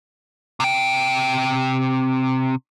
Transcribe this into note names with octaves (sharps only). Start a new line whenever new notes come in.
C3 G5